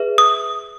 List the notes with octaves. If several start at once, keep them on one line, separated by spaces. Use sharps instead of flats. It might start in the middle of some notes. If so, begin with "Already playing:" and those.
Already playing: G#4 B4 E5
D#6